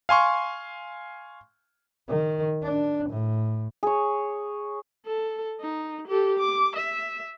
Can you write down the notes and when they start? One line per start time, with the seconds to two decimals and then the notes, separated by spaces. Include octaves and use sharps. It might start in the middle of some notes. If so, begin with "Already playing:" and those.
0.09 F5 G#5 C6 C#6
2.09 D#3
2.62 D4
3.09 A2
3.83 G#4 C#5
5.06 A4
5.61 D#4
6.08 G4 A4
6.39 D6
6.76 E5